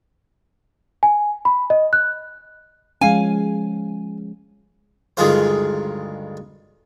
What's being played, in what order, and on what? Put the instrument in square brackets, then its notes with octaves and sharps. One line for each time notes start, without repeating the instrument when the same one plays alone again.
[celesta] G#5
B5
D#5
F#6
[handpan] F3 G#3 C#4 [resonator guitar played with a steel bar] F5 G#5
[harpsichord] D2 G2 D#3 G#3 F4 C5